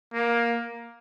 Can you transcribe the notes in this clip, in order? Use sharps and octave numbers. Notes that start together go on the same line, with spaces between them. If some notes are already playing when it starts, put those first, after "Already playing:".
A#3